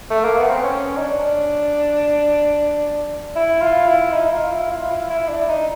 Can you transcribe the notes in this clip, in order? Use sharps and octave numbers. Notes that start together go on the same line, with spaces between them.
A3
A#3
B3
C4
C#4
D#4
D4
E4
F4
E4
D#4
F4
E4
F4
E4
E4
D4
D#4